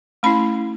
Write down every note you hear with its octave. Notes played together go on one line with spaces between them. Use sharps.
A3 C#4 E4 B5